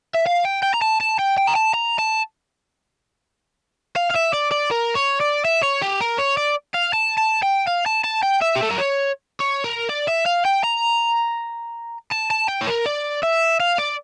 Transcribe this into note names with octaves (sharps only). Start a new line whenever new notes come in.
E5
F5
G5
G5
A#5
A5
A5
G5
G5
A#5
A5
A#5
A5
F5
F5
E5
D5
D5
A#4
C#5
D5
E5
C#5
G4
A#4
C#5
D5
F5
A5
A5
G5
F5
A5
A5
G5
E5
G4
A4
A#4
C#5
C#5
A#4
D5
E5
F5
G5
A#5
A5
A5
G5
C#5
A#4
D5
E5
F5
D5